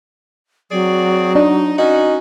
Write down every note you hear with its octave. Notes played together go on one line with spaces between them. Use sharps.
F#3 C4 G#4 D5
D4 D#4
C#4 D#4 F#4